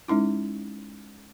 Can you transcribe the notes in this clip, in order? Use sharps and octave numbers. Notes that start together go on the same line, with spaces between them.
G#3 C#4 D#4 E4